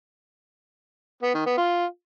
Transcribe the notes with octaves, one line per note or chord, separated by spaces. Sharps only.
B3
D#3
B3
F4